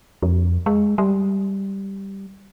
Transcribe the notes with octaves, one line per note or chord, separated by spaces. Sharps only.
F2
G#3
G3